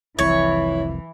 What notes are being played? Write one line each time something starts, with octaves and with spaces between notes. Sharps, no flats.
F1 C2 F2 E3 E4 C#5